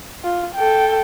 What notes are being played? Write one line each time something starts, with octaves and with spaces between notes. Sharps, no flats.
F4
A4 G5